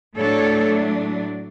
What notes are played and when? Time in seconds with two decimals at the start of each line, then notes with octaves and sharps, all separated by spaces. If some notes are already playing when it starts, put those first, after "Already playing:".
0.16 A2 F#3 A3 D4 A4 C#5